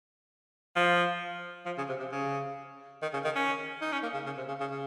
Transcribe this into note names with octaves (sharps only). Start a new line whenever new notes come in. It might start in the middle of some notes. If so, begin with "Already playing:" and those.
F3
F3
C#3
C3
C3
C#3
D#3
C#3
D#3
C#4
D#4
C#4
A#3
C#3
C#3
C3
C#3
C#3
C#3